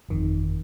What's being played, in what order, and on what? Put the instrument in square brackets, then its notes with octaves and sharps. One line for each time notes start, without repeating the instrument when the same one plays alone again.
[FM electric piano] G1 F2 D#3